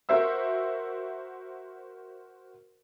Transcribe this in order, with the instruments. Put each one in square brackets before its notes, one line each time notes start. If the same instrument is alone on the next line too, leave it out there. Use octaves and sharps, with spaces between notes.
[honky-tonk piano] F#4 A#4 C5 E5 E6